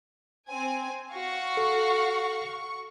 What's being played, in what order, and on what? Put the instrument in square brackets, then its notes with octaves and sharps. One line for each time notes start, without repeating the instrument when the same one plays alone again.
[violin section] C4 G#5
[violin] F#4 F5 [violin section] C#6
[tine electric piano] A4